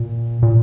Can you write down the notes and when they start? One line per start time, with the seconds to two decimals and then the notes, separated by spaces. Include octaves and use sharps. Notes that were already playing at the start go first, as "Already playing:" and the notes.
Already playing: A#2
0.43 A#2